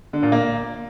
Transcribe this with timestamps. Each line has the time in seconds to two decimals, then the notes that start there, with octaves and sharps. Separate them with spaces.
0.13 D3
0.23 A#2
0.32 A#3